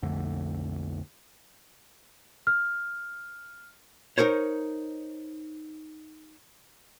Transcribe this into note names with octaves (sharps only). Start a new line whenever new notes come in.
B1 F2 D3 A3
F6
D#4 A#4 C5 C#5